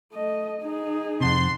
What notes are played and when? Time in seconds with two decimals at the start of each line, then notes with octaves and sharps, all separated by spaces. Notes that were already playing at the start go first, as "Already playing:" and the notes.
0.13 A3 D#5
0.61 D#4 G#4
1.20 F2 C3 F#5 A5 C6